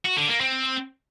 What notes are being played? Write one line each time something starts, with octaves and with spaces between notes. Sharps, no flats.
F#4
D3
A#3
C4